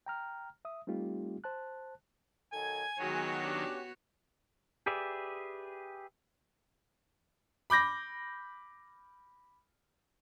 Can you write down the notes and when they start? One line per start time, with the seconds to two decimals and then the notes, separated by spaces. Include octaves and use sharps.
0.06 G5 A#5 F6
0.65 E5 D#6
0.87 G3 A3 C4 D#4 F4 G4
1.44 C5 A5 F#6
2.53 D#3 F#3 A4 G#5 G#6
2.99 C#2 D#3 F#3 G#3 B3 F#4 C#5
3.44 C#4 D4 G4
4.86 G4 G#4 B4 D5 E5
7.70 B5 D6 G6 A#6